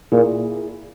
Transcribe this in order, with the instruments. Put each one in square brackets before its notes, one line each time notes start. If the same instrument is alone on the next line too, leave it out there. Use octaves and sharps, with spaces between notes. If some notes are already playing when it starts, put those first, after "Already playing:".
[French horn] A#2 [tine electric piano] E4 G#4